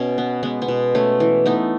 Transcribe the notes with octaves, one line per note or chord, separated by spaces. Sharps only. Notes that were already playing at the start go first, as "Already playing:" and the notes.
Already playing: B2 C#4
B3
G#3 B3
B3
B2
A3 C#4
E3
A3 B3 D#4